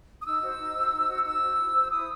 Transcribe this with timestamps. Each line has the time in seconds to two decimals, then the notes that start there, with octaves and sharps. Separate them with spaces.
0.21 D#6
0.25 D#4 E6
0.42 F#4 C5
0.59 D#4
0.75 F#4 C5
0.92 D#4
1.08 F#4 C5
1.24 D#4 E6
1.42 F#4 C5
1.58 E4
1.75 C5
1.91 E4 D#6